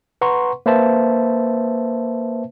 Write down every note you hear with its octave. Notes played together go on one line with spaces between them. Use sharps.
B4 F#5 A#5 C6 C#6
A#3 B4 C5 E5 A5